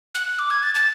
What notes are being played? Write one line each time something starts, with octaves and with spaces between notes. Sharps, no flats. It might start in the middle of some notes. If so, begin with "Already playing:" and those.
F#6
D6
G#6
A6
A6